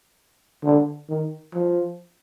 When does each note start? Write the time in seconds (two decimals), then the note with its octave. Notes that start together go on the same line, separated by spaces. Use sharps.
0.63 D3
1.09 D#3
1.54 F3